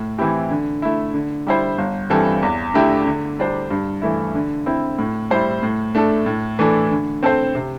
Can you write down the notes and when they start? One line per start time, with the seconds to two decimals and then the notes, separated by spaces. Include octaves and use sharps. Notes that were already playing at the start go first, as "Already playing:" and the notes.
Already playing: A2
0.18 E3 C4 E4 G4
0.50 D3
0.82 A3 E4
1.14 D3
1.47 G3 E4 C5
1.78 G1
2.10 G2 E3 C4 A4
2.42 E2
2.74 D3 A3 E4 G4
3.06 D3
3.39 G3 D4 C5
3.71 G2
4.02 E3 A3 E4
4.35 D3
4.66 C4 E4
4.98 A2
5.30 G3 E4 C5
5.63 A2
5.95 A3 D4 A4
6.26 A2
6.59 E3 A3 D4 A4
6.91 D3
7.23 C4 A4 C5
7.55 C3